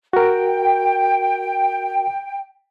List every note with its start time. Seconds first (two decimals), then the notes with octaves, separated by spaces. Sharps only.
0.13 F#4 A#4 G5